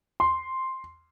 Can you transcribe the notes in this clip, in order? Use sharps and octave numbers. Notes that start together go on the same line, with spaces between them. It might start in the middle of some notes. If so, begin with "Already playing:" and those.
C6